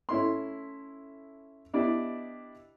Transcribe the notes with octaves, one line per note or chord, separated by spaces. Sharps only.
A3 C#4 E4 A4 C6
B3 D4 E4 G4 D5 D#5